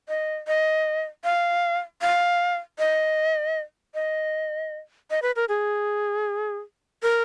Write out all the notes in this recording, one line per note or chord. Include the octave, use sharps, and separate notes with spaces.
D#5
D#5
F5
F5
D#5
D#5
D#5
B4
A#4
G#4
A#4